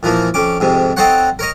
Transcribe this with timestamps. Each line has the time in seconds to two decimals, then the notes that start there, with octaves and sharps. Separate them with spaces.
0.03 A#2 E3 F3 A#3
0.34 F2 C#4 D6
0.60 F2 G#2 C3
0.97 C4 D#4 A4 C5 C#5 F#5
1.39 A#4 C#5 D#5